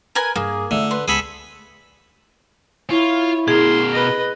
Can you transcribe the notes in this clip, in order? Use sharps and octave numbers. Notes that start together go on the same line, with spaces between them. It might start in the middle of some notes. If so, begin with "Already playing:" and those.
A#4 B4 G#5
G2 A#3 G#4
D3 A3 F4 E5
B4 C6
C#2 B3 G#4 A4 B5
E4 F4 C#5
B2 G#4 A#4 C6
B4 D#5